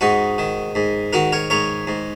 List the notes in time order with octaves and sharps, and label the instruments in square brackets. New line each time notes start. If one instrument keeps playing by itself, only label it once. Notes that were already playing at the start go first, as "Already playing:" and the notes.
[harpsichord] G#2 D#4 F#4
D#3
G#2
D#3 F#4 A#4
A#4 C#5
G#2 A#4 C#5
G#2